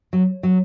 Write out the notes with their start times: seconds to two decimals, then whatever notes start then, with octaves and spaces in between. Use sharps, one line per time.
0.13 F#3
0.43 F#3